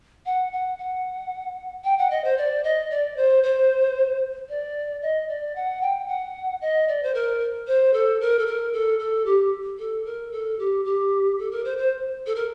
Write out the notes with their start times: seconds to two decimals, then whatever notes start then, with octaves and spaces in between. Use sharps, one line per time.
0.25 F#5
0.52 F#5
0.78 F#5
1.84 G5
1.98 F#5
2.10 D#5
2.24 C5
2.37 D5
2.63 D#5
2.90 D5
3.16 C5
3.43 C5
4.49 D5
5.02 D#5
5.28 D5
5.55 F#5
5.82 G5
6.07 F#5
6.61 D#5
6.88 D5
7.02 C5
7.14 A#4
7.67 C5
7.93 A4
8.20 A#4
8.38 A4
8.46 A#4
8.73 A4
8.99 A4
9.25 G4
9.78 A4
10.05 A#4
10.32 A4
10.59 G4
10.84 G4
11.38 A4
11.51 A#4
11.64 C5
11.77 C5
12.26 A4
12.35 A#4